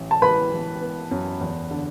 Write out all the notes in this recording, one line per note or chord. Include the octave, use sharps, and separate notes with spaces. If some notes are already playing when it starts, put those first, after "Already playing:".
Already playing: A1
A5
E3 B4 B5
E3
B3
F#2
E2
D3